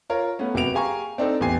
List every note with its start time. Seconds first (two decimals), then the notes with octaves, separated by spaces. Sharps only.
0.10 F4 A#4 C#5 F5
0.39 A3 B3 C#4
0.54 F#1 C3 F#4 B4 D7 F7
0.74 G4 G#4 F5 G#5 A#5 C#6
1.18 C4 D4 D#4 A4 C5
1.40 A1 E2 G4 G#5 C7